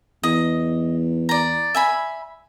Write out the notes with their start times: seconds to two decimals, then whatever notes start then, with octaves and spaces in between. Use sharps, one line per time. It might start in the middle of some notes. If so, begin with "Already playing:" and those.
0.23 E2 D#5
1.29 D5 A#5
1.75 E5 G#5 B5